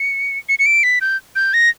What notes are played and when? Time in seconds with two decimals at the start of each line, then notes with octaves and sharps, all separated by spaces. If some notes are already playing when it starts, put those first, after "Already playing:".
Already playing: C#7
0.49 C#7
0.59 C#7
0.66 D7
0.83 B6
1.01 G6
1.36 G6
1.54 A#6